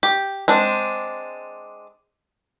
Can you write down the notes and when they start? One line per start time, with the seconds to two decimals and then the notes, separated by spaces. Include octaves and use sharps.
0.03 G4
0.48 G#3 C4 D4